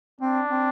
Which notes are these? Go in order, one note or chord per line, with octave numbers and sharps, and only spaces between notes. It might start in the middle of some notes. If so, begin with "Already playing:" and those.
C4 D4
C4